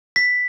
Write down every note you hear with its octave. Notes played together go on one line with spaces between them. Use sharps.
B6